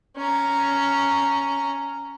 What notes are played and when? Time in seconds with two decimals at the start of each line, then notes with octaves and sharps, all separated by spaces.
0.17 C#4 A#5